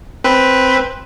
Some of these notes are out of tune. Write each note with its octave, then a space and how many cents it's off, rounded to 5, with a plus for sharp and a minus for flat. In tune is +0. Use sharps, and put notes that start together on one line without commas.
C4 +0 B4 +0